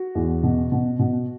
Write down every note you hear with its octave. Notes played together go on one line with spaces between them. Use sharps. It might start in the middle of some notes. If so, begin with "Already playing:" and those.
Already playing: F#4
E2
B2
B2
B2